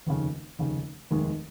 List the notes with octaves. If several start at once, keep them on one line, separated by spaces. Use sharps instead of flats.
F1 D#2 C#3
F1 D#2 C#3
F1 D#2 D#3 G#3